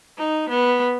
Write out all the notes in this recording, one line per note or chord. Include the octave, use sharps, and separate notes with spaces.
D#4
B3